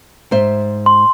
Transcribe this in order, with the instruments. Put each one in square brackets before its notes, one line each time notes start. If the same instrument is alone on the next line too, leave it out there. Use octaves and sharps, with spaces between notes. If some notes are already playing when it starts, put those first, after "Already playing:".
[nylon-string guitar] G#2 C5 E5
[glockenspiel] C6